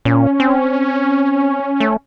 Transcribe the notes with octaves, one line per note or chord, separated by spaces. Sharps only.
A#2 C#4
C4
A3